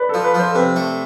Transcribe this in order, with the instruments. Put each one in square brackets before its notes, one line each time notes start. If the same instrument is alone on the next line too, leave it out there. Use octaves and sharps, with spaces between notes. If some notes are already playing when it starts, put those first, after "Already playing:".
Already playing: [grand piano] B4 D5
[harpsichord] F3 [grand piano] A4
[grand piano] B4
[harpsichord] F3 [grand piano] C5
[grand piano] A4
[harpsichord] C3 [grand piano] B4
[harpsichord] A3